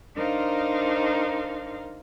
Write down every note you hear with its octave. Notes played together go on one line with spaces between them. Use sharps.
D4 D#4 A#4 C5 F5 C6